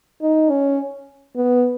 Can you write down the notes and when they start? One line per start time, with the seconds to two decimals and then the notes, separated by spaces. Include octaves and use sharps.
0.22 D#4
0.50 C#4
1.36 B3